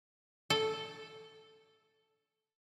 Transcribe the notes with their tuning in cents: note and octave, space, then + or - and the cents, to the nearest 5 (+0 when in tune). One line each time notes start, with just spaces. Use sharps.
A4 +0